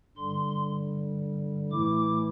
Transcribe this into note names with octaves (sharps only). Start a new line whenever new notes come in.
G2 D3 G3 C6
A2 E3 A3 E4 D6